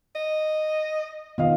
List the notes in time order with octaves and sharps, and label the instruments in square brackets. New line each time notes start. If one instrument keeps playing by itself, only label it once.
[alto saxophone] D#5
[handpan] D#3 B3 [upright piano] F4 D#5 F5